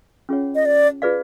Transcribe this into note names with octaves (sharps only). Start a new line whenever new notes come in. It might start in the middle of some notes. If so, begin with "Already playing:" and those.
C#4 F4 G#4 C#5 F#5
D#5
D5
F4 G#4 B4 D5 F5